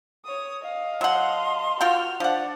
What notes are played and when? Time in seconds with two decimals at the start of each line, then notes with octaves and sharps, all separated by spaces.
0.25 C#5 D#6
0.62 D#5 F5
1.01 F#3 F#5 A5 C6
1.81 F4 F#4 A#4 G5 F6
2.20 F3 D4 D5 F#5